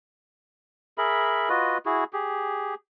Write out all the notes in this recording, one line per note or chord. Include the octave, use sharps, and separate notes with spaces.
G#4 A#4 E5 B5
F4 F#4 B4 D#5
E4 F#4 G#4
G4 G#4